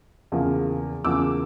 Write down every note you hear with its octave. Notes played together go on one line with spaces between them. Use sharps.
E2 C#3 F3 A#3
E2 C#3 F3 A#3 D6 E6